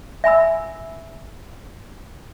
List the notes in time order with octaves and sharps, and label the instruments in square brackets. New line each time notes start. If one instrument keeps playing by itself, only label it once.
[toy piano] E5 G#5 B5 E6